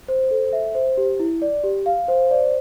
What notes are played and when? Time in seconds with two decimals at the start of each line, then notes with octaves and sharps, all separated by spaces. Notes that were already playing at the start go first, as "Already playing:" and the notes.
0.08 C5
0.31 A4
0.53 E5
0.75 C5
0.97 G4
1.20 E4
1.42 D5
1.64 G4
1.86 F5
2.08 C5
2.31 D5